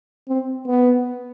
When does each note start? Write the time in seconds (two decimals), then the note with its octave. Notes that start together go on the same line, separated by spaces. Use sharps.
0.28 C4
0.67 B3